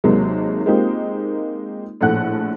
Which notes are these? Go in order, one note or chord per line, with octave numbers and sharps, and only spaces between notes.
D#2 C3 D#3 F#3 G#3 A#3
G#3 A#3 C4 D#4 F4 G4
A#1 A2 A4 F#5 F#6